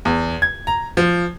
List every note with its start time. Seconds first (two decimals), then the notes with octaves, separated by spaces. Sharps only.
0.05 E2
0.42 G#6
0.67 A#5
0.97 F3